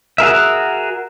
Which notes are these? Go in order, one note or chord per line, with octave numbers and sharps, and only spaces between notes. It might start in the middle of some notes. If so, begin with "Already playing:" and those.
F#4 G#4 A#4 E5